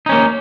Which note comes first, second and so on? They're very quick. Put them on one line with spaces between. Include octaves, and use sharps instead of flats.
D#4 C#4 A#3